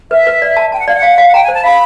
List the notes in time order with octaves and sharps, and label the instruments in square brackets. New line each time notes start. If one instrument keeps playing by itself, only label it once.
[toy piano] B4 [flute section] E5
[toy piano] B4
D5
A5
[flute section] G5 [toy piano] A5
[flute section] F#5
[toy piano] D5 [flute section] F5
[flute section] F#5
[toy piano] F5
F5
[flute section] F#5
[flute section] G5 [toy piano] A#5
[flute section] G#5
[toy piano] C5
[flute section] A5
[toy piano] F5 [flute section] B5